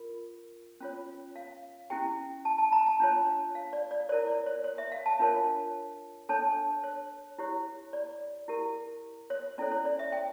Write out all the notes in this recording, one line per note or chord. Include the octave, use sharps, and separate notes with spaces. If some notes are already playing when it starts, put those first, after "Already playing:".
Already playing: F4 A#4
C#4 F4 C#5
F5
C#4 E4 G4 G5
A5
A5
A#5
A5
D4 F4 C#5
F5
D5
D5
E4 A#4 C#5 D5
D5
C#5
C#5
E5
F5
A5
D4 F4 A#4 C#5
D4 A4 C#5 A5
C#5
E4 G4 C#5
D5
E4 G4 A#4
C#5
C#4 E4 A4 C#5 D5
C#5
D5
E5
G5